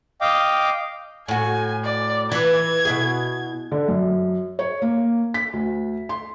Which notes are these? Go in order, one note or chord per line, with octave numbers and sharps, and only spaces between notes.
D#5 F5 G5 D6
A2 F#4 G#5
D5
E3 G#6
B2 E4 G#4
D3
F#2
C#5
A#3
B6
D2
C6